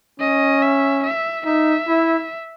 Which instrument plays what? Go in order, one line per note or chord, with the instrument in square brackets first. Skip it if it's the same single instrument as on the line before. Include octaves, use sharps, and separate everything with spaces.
[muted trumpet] C#4 [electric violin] D#5
[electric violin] E5
E5
[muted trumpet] D#4 [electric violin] E5
[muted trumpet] E4